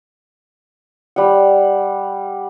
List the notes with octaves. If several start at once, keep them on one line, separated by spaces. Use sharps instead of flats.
G3 F#5